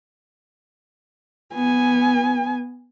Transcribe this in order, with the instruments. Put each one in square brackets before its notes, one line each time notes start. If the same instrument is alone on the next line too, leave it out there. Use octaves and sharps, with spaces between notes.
[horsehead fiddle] B3 G#5